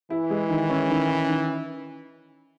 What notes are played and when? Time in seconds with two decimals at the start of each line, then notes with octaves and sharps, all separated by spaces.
0.10 E3 E4
0.30 G#3
0.50 D#3
0.70 C#4
0.90 D#3
1.09 C#4
1.28 D#3